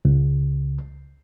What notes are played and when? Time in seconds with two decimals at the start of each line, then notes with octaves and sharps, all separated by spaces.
0.05 C#2